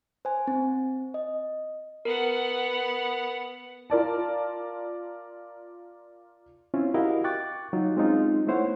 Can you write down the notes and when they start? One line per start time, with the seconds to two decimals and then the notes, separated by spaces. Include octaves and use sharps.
0.25 C5 G#5
0.47 C4
1.14 D#5
2.05 B3 A#4 F#5
3.90 F4 A#4 D5 A5
6.74 C4 C#4 E4 F4
6.94 E4 F#4 G4 A#4 D#5 F5
7.24 G5 C#6 D6 F#6 A6
7.73 F#3 D#4 F4
7.97 G#3 C4 C#4 D#4 F4
8.47 A3 B3 E4 C5 C#5 F#5